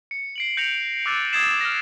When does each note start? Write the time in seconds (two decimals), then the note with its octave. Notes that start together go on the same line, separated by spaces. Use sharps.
0.11 C#7
0.36 C7 D7 F#7
0.57 G6 A#6 C#7 D7 F7
1.06 D6 E6 F#6 A6 F7
1.33 D#6 G#6 A6 C7 E7
1.61 F6 A#6